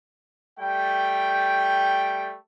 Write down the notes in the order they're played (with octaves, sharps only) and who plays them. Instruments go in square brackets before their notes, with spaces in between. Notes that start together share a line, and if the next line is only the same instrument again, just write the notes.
[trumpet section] G3 A3 G5